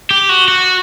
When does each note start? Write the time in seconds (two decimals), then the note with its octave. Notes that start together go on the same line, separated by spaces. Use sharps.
0.11 G4
0.29 F#4
0.48 F#4